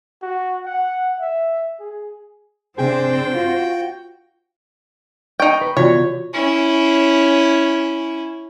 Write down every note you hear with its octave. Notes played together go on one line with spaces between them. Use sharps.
F#4
F#5
E5
G#4
C3 C4 D4 G#4 C5 G5
F4 F#4
D#4 G5 C#6
B4
C3 E3 B3 F4 F#4 C#5 D5
C#4 E4